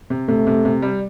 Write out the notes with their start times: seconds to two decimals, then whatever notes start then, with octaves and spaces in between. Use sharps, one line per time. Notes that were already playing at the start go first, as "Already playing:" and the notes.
0.10 C3
0.28 C3 A3
0.47 C3
0.65 C3
0.82 G3